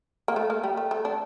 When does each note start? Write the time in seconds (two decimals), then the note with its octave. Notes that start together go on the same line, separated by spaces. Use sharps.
0.28 A#3
0.36 A3
0.50 A#3
0.63 G3
0.77 A3
0.91 A3
1.05 D4